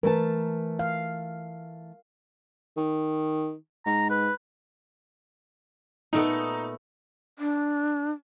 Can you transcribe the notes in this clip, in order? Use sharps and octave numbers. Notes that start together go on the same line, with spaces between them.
E3 A3 A#4 A5
F5
D#3
G#2 A#5
B4
A#2 A3 B3 D#4
D4